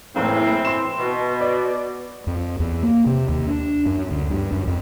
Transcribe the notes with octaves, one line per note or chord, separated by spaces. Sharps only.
F#1 A2 E3 C4
C6 E7
B2
D5
F2
E2
A#3
C3
D#2
D4
F#2
D2
G2
F#2
F2